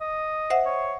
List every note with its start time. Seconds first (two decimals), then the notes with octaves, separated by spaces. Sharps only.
0.01 D#5
0.50 C5 E5 F#5
0.66 C#5